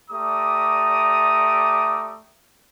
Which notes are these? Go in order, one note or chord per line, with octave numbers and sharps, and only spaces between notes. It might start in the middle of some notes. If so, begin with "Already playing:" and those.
A3 G4 D5 A#5 D6 D#6